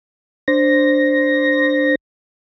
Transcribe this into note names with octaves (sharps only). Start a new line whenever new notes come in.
D4 C5 A#6